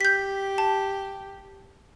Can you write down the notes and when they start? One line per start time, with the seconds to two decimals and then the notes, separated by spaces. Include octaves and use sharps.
0.01 G4 G6 B6
0.58 A5